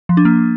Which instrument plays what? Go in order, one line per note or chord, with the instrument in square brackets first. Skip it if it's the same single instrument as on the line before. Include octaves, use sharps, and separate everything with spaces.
[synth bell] F3
D4
A#3